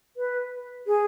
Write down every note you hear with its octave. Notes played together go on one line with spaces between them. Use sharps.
B4
G#4